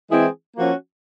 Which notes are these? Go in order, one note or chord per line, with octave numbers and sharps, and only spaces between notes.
E3 G#3 C4 E4 G#4
F3 A#3 C#4 F#4